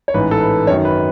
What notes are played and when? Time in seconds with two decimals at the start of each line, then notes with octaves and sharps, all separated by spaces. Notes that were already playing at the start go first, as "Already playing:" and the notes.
0.08 C#5
0.14 A1 G#2 E3 B4
0.31 A4
0.41 B4
0.67 G#1 F#2 D#3 F#3 C#5
0.85 B4